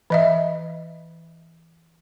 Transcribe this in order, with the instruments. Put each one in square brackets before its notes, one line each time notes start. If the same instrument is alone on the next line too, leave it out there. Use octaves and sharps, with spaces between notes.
[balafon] E3 D#5 E5